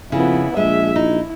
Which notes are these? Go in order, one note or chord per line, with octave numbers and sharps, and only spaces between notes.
F2 C#3 B3 E4
A#1 G#3 E5
D#4 E4